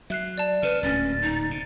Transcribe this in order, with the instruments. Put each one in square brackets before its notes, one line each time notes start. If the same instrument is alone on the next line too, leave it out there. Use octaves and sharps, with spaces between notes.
[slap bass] F#3 [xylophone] E5 F#6 C7
[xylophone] D5 A5
[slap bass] C3 [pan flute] B4 [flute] F6
[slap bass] D1 D2 A#2 [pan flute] C#4 [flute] A6
[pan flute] D#4
[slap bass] C3